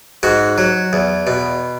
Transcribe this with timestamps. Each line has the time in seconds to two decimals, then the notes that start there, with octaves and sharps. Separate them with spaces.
0.23 G#2 F#4
0.58 F#3
0.93 E2
1.27 B2